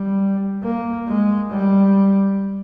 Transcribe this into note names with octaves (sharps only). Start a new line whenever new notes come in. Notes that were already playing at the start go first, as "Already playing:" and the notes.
Already playing: G3
A#3
G#3
G3